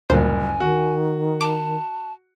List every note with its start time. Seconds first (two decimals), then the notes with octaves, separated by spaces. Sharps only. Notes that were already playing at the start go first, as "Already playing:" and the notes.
0.10 F#1 D2 G2 A#2 A#4 C5 G#5
0.60 D#3 F#4
1.41 A5 D6